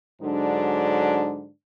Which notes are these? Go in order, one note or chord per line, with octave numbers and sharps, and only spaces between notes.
G#2 D3 F#3 D4